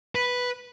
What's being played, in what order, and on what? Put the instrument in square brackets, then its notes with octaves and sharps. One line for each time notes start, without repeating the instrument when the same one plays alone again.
[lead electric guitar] B4